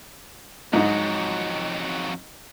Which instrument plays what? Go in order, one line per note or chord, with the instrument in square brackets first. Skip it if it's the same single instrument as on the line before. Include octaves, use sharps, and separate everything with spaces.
[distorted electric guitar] F2 F#3 [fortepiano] G#2 D#4